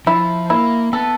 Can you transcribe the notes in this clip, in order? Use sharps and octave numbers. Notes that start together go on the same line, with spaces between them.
F3 E4
A#3 E4
B3 A4